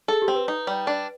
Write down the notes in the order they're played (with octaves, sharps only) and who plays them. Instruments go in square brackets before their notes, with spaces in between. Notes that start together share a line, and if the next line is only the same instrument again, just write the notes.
[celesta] G#4 [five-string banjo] A4
[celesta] G4
[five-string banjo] C4
[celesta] B4
[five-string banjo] D#4
G3
D4